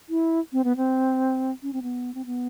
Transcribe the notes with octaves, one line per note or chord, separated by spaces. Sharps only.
E4
C4
B3
C4
C#4
C4
B3
C4
B3